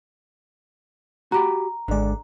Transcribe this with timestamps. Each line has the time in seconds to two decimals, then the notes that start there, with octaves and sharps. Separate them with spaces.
1.32 F#4 G4 A#5 B5
1.88 G#1 D3 G#3 D5